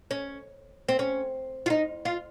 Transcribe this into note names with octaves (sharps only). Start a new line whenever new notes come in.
C#4
C4
C#4
F4
D#4
F4